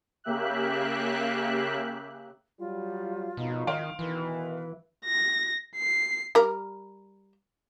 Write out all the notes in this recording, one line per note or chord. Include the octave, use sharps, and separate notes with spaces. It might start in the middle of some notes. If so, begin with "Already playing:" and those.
C#3 A#3 G4 E5 F#6
F#3 G3 F4
G#1 F2 B2 D#4
D#3 F5 C6 D7
B2 D#3 E3 B4
A#6
C7
G3 A#4